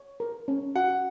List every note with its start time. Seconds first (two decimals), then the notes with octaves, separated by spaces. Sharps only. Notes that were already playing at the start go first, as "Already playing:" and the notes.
Already playing: C#5
0.20 A#4
0.48 C#4
0.75 F#4 F#5